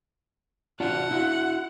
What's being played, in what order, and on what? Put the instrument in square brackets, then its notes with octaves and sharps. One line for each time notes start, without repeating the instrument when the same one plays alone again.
[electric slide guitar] D4 F4 F#4 [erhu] F#5
[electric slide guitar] E4 F#4